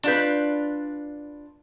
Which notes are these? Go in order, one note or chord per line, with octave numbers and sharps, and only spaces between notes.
D4 F4 B4 D5 G6